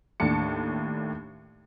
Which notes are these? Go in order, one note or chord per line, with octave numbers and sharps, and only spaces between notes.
D#2 A2 D4 A5 C#7